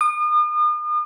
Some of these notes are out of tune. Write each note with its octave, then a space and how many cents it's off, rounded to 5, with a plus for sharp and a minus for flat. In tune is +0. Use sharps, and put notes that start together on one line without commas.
D#6 -40